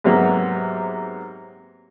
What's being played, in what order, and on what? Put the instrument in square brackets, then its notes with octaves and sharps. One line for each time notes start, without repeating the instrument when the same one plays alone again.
[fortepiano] G#2 C3 F#3 A#3 B3